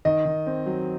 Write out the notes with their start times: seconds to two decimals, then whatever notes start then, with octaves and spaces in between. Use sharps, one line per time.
0.05 D#3 D#5
0.25 D#3
0.47 C4
0.66 F#3